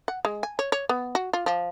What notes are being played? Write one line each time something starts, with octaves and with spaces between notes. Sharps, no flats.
F#5
G#3
G#5
C#5
C#5
B3
F#4
F4
F3